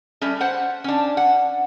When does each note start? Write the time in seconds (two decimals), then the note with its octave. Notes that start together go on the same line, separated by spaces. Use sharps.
0.21 G3 A3 C#4
0.41 C5 F#5
0.84 C#4 D4
1.17 F#5